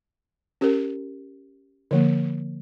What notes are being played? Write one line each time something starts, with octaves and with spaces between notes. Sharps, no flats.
C#4 G4 A#4
D3 F3 A#3